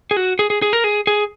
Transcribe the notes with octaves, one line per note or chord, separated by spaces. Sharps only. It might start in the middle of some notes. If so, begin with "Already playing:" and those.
G#4
F#4
G#4
G#4
G#4
A#4
G#4
G#4